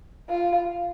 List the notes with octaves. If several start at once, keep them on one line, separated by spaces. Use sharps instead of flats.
F4